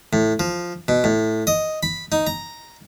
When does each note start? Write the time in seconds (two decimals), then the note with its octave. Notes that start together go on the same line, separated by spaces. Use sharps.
0.13 A2
0.40 F3
0.88 B2
1.04 A2
1.47 D#5
1.83 B5
2.12 D#4
2.27 A#5